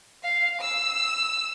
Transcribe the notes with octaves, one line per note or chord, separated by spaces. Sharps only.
F5
E6